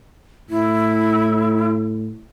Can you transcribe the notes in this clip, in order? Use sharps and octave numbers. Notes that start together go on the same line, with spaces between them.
A2 E4